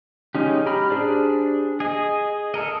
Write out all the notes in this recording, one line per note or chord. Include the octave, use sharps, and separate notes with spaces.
G#3 C#4 D#4 G4
G4 A#5 B5 F6
D4 G4 G#4 C5 D5
G#4 D#5
A4 A#4 D#5